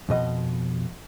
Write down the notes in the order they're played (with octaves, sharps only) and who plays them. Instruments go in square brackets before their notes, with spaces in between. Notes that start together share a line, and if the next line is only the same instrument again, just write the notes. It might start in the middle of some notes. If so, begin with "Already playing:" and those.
[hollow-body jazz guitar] F2 B2 D#5